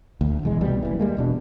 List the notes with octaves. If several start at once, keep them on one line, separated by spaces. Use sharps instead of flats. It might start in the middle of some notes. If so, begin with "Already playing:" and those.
D2
E1 E2 G#3
C2 B2 G3
F#1 B1 E3
G3 G#3 A#3
E1 B2 D4